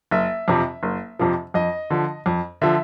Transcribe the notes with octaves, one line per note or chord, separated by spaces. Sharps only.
F#1 E5
F2 C3 F3
F#1
F2 C3 F3
F2 D#5
D3 F3
F2
D3 F3 E5